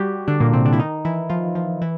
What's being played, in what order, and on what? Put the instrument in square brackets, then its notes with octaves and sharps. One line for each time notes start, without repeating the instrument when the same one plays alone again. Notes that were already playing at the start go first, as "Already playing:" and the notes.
Already playing: [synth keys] G3 F#4 G4
D3 D4
A#2 A#3
C3 C4
D3 D4
E4
D#3 D#4
E3 E4
F3 F4
F3 F4
E3 E4